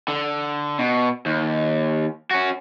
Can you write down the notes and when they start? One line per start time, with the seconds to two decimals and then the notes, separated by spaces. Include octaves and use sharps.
0.08 D3
0.79 B2
1.26 D#2
2.31 C#4 F#4